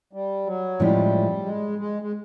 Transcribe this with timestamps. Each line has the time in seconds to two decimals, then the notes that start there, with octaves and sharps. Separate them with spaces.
0.13 G3
0.47 F#3
0.80 A2 F3 G3 G#3 C#4 E4
1.45 G#3
1.79 G#3
2.02 G#3